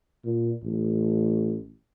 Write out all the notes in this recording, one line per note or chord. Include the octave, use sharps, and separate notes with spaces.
A#2
A1